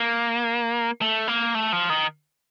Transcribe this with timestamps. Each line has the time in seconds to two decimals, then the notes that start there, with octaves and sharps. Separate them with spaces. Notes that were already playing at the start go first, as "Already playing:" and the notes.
Already playing: A#3
1.01 A3
1.28 A#3
1.55 A3
1.73 F3
1.90 D#3